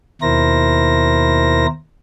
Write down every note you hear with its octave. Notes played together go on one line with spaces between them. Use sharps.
D#2 B2 E4 A#4 C5 A#6